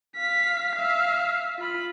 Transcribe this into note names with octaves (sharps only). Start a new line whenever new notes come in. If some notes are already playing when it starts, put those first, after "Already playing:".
F5 B6
E5 F5
F4 B5